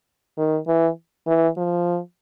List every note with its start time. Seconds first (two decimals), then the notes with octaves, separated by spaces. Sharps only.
0.38 D#3
0.67 E3
1.27 E3
1.57 F3